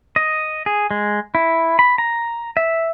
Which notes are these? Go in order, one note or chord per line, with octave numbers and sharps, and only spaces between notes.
D#5
G#4
G#3
E4
B5
A#5
E5